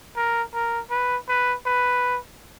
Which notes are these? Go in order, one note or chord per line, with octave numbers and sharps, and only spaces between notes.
A#4
A#4
B4
B4
B4